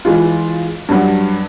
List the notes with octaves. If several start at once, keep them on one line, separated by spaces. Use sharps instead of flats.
E3 G#3 F4
G2 F#3